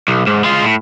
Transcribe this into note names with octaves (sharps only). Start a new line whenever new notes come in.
B1
G#2
G#3 F4
A2